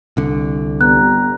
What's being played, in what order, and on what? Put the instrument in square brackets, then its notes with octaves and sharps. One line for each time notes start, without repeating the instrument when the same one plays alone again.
[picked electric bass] C2 D3
[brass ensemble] G1 G3 A#5 [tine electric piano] B3 [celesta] F#6